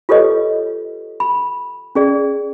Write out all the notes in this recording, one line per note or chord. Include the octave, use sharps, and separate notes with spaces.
F4 G4 A4 B4 C#5 D#5
B5
C#4 G#4 D5